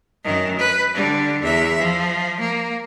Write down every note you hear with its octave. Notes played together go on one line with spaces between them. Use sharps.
F#2 D#3
B4
D3 G3
E2 E5
F3
A#3